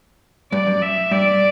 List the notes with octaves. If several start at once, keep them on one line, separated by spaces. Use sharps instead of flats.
G2 D5
F#2
E5
G2 D5